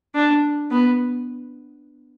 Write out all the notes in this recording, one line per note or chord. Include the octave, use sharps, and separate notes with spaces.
D4
B3